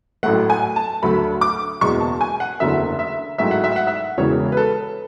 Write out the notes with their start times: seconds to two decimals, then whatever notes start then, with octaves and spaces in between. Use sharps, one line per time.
0.23 A1 A2 F#3 A3 F#5
0.50 G#5
0.76 A5
1.03 D2 D3 F#3 A3 B5
1.41 D6
1.81 F#1 E2 B2 G#3 C#6
2.01 A5
2.21 G#5
2.40 F#5
2.60 F#1 E2 D3 A3 E5
2.99 E5
3.38 A1 G#2 F#3 A3 E5
3.51 F#5
3.64 E5
3.76 F#5
3.87 E5
4.18 E1 E2 C#3 E3 C#5
4.52 B4
4.57 A4